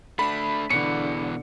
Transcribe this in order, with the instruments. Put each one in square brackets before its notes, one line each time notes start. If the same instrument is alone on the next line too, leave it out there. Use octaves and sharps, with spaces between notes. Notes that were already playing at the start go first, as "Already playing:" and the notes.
[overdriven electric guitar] A3 D4 [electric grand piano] B5
[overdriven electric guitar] B2 E3 [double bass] D3 [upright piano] C#7